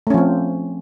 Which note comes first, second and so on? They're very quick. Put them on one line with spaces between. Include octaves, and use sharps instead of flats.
A3 C#4 F3 C4